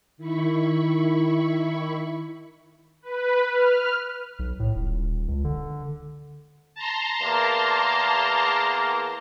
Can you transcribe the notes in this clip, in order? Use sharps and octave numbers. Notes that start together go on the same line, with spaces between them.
D#3 E4 B5 C#6
B4
F6
B1
A2
D#1
C#2
D3
A5 A#5 C6
E2 A#3